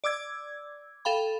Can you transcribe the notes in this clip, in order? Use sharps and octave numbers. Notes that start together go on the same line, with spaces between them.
D5 D6 E6 G#6
A4 F5 G5 B5